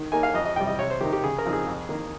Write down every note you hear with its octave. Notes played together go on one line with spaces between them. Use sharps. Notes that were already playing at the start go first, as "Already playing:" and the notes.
Already playing: D#3
A#3 D#4 G#5
F5
F2 D#5
D#5
C3 G3 G5
D#5
C3 C#5
C5
D#3 A#3 D#4 G4
G4
C#3 G#4
A#4
F3 C4 D#4
G#4
F2
D#3 A#3